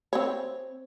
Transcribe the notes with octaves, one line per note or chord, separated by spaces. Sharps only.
C4 C5 C#5